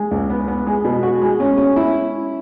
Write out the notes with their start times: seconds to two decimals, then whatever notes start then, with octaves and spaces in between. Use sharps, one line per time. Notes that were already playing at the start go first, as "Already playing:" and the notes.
Already playing: G#3
0.11 C#2
0.30 B3
0.48 B3
0.67 G#3
0.84 B2
1.03 F#4
1.22 G#3
1.40 C#4
1.58 C#4
1.76 E4